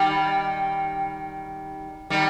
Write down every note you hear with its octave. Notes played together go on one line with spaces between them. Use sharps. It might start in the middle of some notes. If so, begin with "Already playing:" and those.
Already playing: D#3 G3
D#3 G3